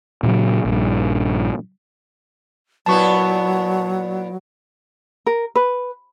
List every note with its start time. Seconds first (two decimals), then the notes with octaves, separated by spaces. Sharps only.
0.23 A#2 C#3 F3 F#3
0.65 A#1 G2
2.86 A#2 F#3 B3 E4 A5 C#6
5.27 A#4
5.56 B4